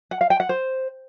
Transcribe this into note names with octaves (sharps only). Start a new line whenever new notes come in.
F#5
F5
G5
F#5
C5